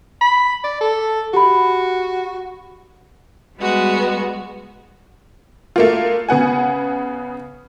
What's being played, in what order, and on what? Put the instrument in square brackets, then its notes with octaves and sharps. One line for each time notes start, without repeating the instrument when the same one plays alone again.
[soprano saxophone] B5
D5
A4
[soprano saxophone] F#4 [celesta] G4 B5
[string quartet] G3 G#3 B3 F#4
[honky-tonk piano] A3 A#3 F4
C#3 B3 F#5 G#5